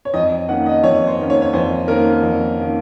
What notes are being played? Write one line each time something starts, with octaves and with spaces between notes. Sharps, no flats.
C#5
F2 D#5
D#3 A#3 C#4 F#5
D#5
F2 C#5
C5
D#3 A#3 C#4
C#5
C#5
F2 C5
D#3 A#3 C#4 A#4
F2
D#3 A#3 C#4